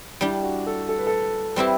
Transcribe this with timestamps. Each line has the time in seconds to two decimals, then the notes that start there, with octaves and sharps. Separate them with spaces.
0.21 G3 D4 E4 G4
0.43 F#4
0.67 A4
0.89 A4
0.99 B4
1.07 A4
1.56 G3 C4 E4 G4 B4